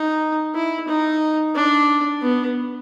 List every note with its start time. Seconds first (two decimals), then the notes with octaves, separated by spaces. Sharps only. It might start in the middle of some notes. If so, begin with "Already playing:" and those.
Already playing: D#4
0.55 E4
0.88 D#4
1.56 D4
2.22 B3